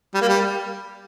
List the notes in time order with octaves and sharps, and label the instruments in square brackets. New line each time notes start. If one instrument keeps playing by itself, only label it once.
[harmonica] G3
A#3
G3